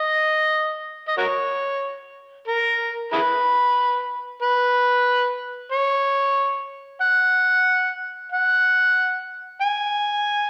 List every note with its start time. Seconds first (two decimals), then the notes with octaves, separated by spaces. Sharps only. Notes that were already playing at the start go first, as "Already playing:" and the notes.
Already playing: D#5
1.08 D#5
1.18 F#4 A#4 C#5
2.48 A#4
3.12 E4 G#4 B4
4.42 B4
5.72 C#5
7.01 F#5
8.32 F#5
9.62 G#5